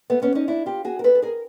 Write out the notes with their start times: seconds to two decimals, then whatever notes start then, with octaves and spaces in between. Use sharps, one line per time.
0.10 A3 B3
0.22 B3 C#4
0.35 C#4 D#4
0.48 D4 E4
0.66 F4 G4
0.85 F#4 G#4
0.99 A#4
1.04 A4 B4
1.15 A4
1.22 G#4 A#4